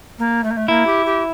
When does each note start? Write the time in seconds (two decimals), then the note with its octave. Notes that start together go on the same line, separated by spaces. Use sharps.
0.18 A#3
0.43 A3
0.50 A#3
0.56 A3
0.68 A#3 E4
0.86 G4
1.05 G4